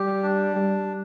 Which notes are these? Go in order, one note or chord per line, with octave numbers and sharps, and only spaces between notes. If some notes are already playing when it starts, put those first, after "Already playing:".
Already playing: G3 G4
D4
G3